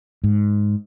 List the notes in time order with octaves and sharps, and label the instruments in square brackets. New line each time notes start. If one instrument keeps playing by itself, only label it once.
[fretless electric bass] G#2